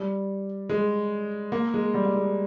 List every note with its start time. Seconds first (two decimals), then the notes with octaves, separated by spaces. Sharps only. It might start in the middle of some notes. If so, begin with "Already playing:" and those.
Already playing: G3
0.69 G#3
1.52 A#3
1.74 G#3
1.94 G3
2.05 A#3
2.15 G#3